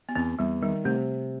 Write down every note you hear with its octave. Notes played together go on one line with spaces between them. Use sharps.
B3
E2 C4
E2 G3
D#3 G3
C3 A3